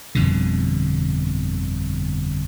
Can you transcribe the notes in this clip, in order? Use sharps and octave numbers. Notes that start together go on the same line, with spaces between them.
G1 F2 B2 D3